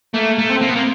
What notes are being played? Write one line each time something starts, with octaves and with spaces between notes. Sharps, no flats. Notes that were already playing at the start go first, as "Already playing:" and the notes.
A3 A#3
A3
C4
A#3
B3
A#3